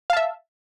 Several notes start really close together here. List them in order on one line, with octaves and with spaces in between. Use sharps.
F5 A5 E5